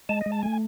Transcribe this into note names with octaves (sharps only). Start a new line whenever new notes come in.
G#3 A5
G#3 D#5
A5
A3 G#5